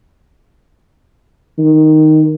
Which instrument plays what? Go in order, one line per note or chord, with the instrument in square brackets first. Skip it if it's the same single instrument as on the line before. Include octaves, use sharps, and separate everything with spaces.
[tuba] D#3